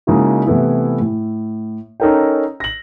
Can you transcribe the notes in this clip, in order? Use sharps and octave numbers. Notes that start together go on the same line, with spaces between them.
C#3 G#3 A#3 D#4 E4 F#4
C3 E3 A3 B3 E4
A2
C#4 D#4 A4 A#4 C#5 G5
A#6 F#7